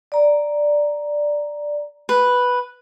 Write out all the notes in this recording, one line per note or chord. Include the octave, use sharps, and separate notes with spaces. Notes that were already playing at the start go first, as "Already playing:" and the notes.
D5 A#5
B4